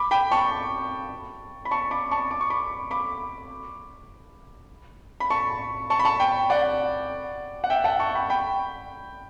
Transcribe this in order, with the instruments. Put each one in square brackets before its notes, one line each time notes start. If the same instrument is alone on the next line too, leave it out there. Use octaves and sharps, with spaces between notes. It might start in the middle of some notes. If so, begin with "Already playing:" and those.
Already playing: [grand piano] B5 D6
G5 B5
A5 C#6
B5
A5 C#6
B5 D6
A5 C#6
D6
C#6
B5 D6
B5 D6
B5
A5 C#6
A5 C#6
B5
A5 C#6
G5 B5
D5 F#5
F#5
E5 G5
F#5 A5
A5 C#6
C#6
G5 B5
G5 B5